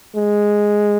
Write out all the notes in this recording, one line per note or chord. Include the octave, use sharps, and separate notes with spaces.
G#3